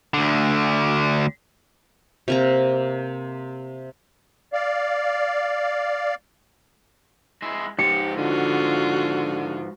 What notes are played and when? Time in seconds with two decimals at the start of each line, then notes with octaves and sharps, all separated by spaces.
0.14 D2 D3
2.28 C3 A#3 A#5
4.53 D5 F5
7.42 G#3 E4
7.79 G#2 F3 G4 C#7
8.17 D3 F4 F#4